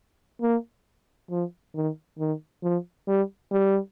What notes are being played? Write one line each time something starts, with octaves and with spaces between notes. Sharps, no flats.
A#3
F3
D#3
D#3
F3
G3
G3